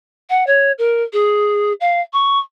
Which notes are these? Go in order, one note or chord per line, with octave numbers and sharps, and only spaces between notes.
F#5
C#5
A#4
G#4
F5
C#6